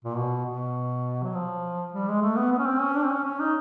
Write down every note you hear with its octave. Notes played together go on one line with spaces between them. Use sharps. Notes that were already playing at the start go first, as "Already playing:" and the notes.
A#2
B2
B2
F#3
F3
G3
G#3
A3
B3
B3
C#4
C4
C#4
D4
C4
C#4
C#4
D#4